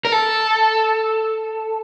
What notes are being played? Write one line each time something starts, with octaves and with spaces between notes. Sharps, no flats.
A#4
A4